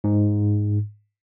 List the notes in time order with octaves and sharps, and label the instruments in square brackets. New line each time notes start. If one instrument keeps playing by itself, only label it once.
[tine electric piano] G#2